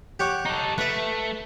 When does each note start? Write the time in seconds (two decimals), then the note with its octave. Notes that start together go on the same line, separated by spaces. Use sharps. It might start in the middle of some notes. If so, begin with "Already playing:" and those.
0.20 G4 C#5 F#5
0.45 D#4 A4
0.78 A3 B4 E5